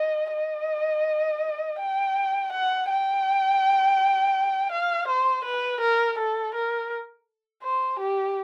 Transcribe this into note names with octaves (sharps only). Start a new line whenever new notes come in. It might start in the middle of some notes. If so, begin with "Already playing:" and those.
Already playing: D#5
D#5
G5
F#5
G5
F5
C5
B4
A#4
A4
A#4
C5
G4